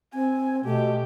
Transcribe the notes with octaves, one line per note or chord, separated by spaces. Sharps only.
C4 G#5
B2 A3 G4